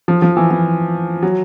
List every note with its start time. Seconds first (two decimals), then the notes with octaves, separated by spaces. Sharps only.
0.08 F3
0.22 F3
0.37 E3
0.51 E3
1.23 F#3